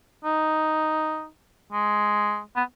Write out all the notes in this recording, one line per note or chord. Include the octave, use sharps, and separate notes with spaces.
D#4
G#3
B3